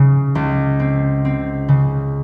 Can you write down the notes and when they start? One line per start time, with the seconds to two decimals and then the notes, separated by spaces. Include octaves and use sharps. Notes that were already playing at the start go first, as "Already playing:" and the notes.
Already playing: C#3
0.35 C#2
0.80 C4
1.25 C4
1.69 C#3